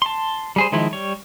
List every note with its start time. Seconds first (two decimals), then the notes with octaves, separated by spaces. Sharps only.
0.02 A5 C6
0.56 G3 G#4 C5
0.72 D#3 F3 G#3 E4
0.93 G3 C#5